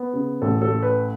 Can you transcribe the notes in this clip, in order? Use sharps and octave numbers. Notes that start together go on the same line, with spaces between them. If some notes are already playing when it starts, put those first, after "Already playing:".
Already playing: B3
C#3
A1 A4
A4
A3
B4